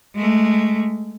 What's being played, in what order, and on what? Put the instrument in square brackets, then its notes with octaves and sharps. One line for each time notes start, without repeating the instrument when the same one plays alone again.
[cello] G#3 A3